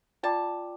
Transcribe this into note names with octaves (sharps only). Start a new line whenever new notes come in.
F4 D5 G5 A5 D6